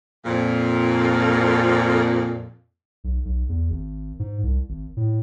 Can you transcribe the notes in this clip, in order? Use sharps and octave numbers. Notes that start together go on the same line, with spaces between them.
F2 A#2
B1
B1
E2
G#1
G#2
C2
G#1
A2